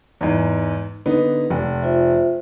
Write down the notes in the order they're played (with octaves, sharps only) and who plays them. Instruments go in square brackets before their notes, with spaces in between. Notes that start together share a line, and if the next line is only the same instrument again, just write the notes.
[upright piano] E2 G#2
D3 B3 D#4
F1
[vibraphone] F4 C5 E5